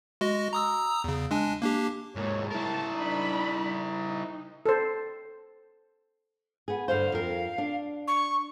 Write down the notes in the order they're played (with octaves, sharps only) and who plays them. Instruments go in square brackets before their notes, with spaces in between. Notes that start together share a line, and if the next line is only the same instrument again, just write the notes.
[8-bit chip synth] G#3 F#4 D#5
A#5 D#6 E6
E2 C#3
G#3 D4 G#5
A#3 D4 G4
[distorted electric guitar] G#2 A#3 [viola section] G#3 C#5
[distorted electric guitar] E4 A#4 [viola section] A5
[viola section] D4 D#4 B5
D#4
[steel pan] A4 C5
[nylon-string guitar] B3 G#4
[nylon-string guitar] G2 D3 C5 [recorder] F5
[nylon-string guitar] F2 A#4
D4
[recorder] C#6